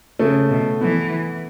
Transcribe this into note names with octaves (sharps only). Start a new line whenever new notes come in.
C#3 A3
B2
E3 B3